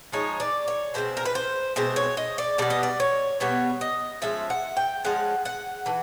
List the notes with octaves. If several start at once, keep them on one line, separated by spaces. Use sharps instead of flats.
F3 G#3 D#4 C#5
D5
C#5
B2 G#3 C4 C5
A#4
B4
C5
B2 G#3 C4 C5
C#5
D#5
D5
B2 G3 B3 D5
D#5
D5
C#5
B2 G3 B3 C#5
D#5
F3 G#3 C#4 E5
F#5
G5
F3 G#3 C#4 F#5
F#5
E3 A3